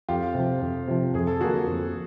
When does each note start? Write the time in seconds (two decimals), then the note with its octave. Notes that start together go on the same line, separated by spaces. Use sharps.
0.09 F2 F4 G4
0.34 C3 F3
0.62 F2
0.88 C3 F3
1.14 F2 G#4
1.27 A4
1.40 D3 F#3 A#3 F#4 G#4
1.67 F2